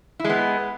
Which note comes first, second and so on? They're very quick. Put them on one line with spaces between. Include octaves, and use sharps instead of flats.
E4 G#3 B3